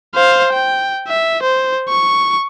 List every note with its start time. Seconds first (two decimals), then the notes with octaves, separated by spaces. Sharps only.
0.15 C5 F5
0.53 G5
1.08 E5
1.43 C5
1.89 C#6